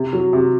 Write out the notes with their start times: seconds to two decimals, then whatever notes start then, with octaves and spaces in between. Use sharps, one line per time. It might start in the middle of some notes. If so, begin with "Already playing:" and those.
Already playing: C3
0.13 F#3
0.33 C3